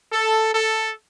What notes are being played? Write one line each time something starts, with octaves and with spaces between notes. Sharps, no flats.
A4
A4